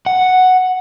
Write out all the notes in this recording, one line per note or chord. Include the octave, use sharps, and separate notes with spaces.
F#5